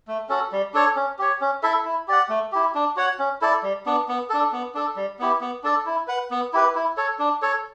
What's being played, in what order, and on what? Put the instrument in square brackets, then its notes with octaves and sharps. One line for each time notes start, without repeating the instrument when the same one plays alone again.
[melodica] A3
C#4 F#4 A4
G3
D4 A4 C#5
C#4
G4 C#5
C#4
E4 A4 E5
E4
G4 D5 F#5
A3
E4 G4
D4
F#4 C#5 F#5
C#4
E4 A4 D5
G3
B3 D4
B3
D4 A4
B3
D4 A4
G3
B3 E4 G4
B3
D4 A4 D5
E4
B4 F#5
B3
E4 G4 B4
E4
A4 C#5
D4
A4 C#5